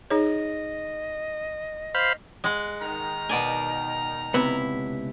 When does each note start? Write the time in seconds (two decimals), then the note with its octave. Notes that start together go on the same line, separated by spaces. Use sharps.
0.10 D#4 G#4 C#5 D#5
1.94 C5 F5 B5
2.44 G#3 F#5
2.82 D#3 A#5
3.29 B2 D5 G#5
4.34 C#2 C3 B3 E4